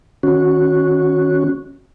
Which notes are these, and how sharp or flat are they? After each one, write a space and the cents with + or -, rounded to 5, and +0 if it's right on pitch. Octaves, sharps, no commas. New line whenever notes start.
D#3 +0 C#4 +0 F#4 -10